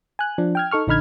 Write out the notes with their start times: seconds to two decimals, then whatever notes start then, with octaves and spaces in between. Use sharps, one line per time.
0.19 G#5 F#6
0.38 F3 D4
0.55 G5 F6 G#6
0.71 D#4 A4 C#6 F6
0.87 A#1 D3 D#4 B5 F6 G#6